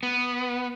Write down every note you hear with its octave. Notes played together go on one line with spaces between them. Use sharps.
B3